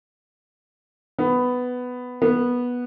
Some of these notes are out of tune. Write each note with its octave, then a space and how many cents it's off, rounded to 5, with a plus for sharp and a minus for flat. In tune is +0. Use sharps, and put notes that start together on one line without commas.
B3 +10
B3 -10